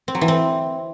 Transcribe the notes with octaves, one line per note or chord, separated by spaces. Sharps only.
C4
F#3
E3
C4